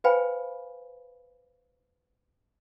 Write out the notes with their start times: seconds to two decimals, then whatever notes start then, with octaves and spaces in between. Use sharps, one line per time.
0.04 B4 C5 F5 G5 G#5 B5